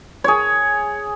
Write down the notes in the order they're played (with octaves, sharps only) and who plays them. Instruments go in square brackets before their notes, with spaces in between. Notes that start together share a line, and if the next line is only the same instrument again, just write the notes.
[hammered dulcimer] G#4 C#5